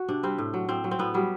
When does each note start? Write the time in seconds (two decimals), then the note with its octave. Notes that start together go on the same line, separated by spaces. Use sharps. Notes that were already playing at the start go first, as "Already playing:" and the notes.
Already playing: F#4
0.08 C3 D4
0.23 G3 C4
0.38 A2
0.54 F#3
0.69 A2 C4
0.84 F#3
0.91 C4
0.99 A2 B3
1.14 F#3 G3